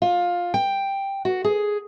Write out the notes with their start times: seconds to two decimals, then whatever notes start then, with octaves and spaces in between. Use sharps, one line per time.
0.02 F4
0.54 G5
1.25 F#4
1.44 G#4